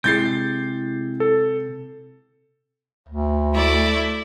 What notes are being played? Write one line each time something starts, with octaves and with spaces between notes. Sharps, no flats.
C3 G#3 E4 G#4 G6 A6 C7
A4
D2
A3 E4 D5